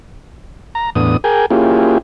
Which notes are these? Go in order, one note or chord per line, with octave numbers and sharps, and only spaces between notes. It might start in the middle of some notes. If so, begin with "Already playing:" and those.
A#5
E2 A2 B3 D4 D#6
G#4 A#4 G5 G#5
A#3 C#4 E4 F4 G4 G#4